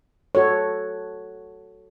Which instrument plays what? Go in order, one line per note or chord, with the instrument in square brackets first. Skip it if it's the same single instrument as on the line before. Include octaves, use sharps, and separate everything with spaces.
[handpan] F#4 A4 C#5